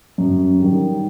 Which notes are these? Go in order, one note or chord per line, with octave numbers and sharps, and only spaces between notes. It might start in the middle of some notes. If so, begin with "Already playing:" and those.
F#2
D#3 G3